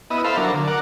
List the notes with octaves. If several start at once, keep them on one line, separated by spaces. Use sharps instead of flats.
B3 E4 D#5
A4 C5 E5 F5 B5
F#3 D4 A#4
D3
A#4 D5 F#5